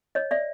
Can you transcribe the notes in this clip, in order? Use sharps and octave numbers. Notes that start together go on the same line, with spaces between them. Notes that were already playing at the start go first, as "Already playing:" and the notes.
C#5 D#5
D5 E5